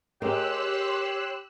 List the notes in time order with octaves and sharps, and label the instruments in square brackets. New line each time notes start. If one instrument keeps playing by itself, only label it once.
[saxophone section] G4 [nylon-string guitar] G#4 A#4 D#5 [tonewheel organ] C#5 C6 [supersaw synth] E6 F#6